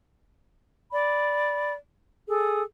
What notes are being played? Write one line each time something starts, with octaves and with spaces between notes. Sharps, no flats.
D5 B5
G#4 A4